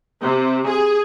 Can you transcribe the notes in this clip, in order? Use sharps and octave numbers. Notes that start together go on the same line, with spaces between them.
C3
G#4